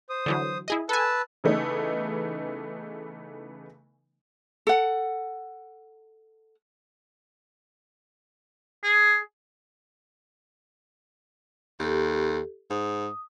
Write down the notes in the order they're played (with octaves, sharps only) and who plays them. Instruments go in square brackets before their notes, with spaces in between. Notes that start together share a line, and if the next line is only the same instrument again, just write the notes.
[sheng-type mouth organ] C5 D#6
[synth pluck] D3 E3 F#3
E4 G#4 D#5
[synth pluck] A4 G#5 [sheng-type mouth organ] B4 A5 E6
[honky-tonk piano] C#3 E3 A3 B3 D#4
[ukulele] A4 F#5
[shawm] G#4
[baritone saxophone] D#2 [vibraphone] G4 A4
[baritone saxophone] G#2 [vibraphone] D#6